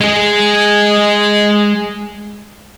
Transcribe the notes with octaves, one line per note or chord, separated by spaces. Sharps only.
G#3 G#4